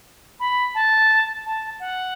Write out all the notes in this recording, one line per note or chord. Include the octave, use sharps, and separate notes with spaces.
B5
A5
A5
F#5